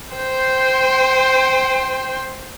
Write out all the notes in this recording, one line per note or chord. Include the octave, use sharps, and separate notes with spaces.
C5 G5